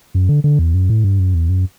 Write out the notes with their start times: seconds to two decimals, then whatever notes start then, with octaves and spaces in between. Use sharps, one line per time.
0.14 F#2
0.29 D3
0.44 D3
0.59 E2
0.74 F#2
0.90 A2
1.04 G2
1.19 F#2
1.34 E2
1.49 F#2